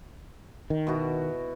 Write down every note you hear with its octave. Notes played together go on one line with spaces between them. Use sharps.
D#3
B2 E4 F#4